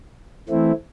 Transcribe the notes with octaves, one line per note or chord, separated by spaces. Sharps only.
E3 A3 C4 E4